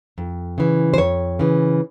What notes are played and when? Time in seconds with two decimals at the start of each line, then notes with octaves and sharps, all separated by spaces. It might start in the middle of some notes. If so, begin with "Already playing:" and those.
0.18 F2
0.58 C#3 E3
0.94 C5
0.98 F2 C#5
1.39 C#3 E3